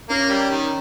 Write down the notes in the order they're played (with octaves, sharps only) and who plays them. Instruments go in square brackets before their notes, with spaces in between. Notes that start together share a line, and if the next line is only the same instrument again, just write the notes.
[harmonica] A#3 [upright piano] C#4
[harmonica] G3
D#3